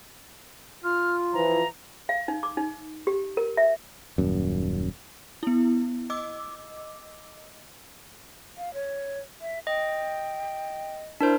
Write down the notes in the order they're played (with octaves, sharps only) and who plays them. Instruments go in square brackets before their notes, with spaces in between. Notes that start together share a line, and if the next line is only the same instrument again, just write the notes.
[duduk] F4 [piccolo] F6
[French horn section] E3 F3 [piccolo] A#5
[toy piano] F5
D#4
D6
D#4
G4
A#4
E5
[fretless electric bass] D#1 F#2
[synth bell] B3 E4
D#5 D6 E6
[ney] F5
C#5
E5
[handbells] D#5 [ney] G5
[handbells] D4 A#4 C5 [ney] E4